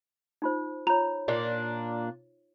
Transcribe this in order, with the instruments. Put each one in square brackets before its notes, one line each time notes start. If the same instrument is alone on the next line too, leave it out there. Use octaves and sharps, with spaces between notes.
[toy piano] D#4 F4 C5
[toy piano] F4 C#5 [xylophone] A#5
[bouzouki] A#2 A#3 D4